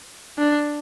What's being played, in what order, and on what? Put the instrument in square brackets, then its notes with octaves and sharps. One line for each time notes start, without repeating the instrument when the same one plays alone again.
[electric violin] D4